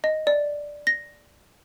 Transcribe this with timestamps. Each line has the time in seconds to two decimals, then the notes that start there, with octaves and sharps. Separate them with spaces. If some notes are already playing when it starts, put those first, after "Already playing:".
0.04 D#5
0.27 D5
0.87 A#6